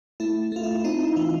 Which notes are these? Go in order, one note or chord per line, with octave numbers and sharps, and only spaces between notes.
A3 E4
A3 F4
E4
E4
C4 D#4
E4
E3 F4